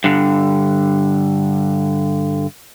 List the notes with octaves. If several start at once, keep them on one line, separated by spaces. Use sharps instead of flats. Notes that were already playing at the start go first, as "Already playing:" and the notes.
G2 D3